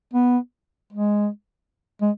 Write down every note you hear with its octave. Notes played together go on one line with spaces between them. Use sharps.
B3
G#3
G#3